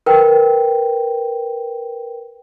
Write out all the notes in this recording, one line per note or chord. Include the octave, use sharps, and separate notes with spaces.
A#4 B4 G5